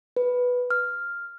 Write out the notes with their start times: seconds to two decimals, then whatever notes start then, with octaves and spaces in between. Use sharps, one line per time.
0.17 B4
0.71 F6